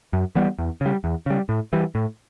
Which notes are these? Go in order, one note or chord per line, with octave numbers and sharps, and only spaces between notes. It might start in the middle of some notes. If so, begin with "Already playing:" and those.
F#2
E3 G3 B3
E2
C#3 G3
E2
C#3 G3
A2
E3 G3
A2